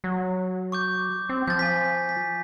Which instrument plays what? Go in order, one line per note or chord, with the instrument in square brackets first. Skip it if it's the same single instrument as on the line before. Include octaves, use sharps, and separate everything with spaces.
[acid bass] F#3
[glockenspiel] C#6 D6 G6
[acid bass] C4
[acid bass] F3 [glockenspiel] G6 A6
[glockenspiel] G#5 B6
B6